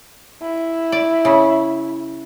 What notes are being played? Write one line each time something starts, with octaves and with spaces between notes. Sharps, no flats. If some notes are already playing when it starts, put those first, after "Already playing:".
E4
D5
C#3